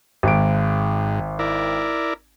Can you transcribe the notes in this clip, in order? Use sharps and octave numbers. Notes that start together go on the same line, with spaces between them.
G#1 G#2 D7
E4 A#4 D5